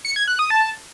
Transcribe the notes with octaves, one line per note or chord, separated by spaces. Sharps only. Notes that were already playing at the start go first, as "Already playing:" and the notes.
C#7
G#6
F#6
D#6
A5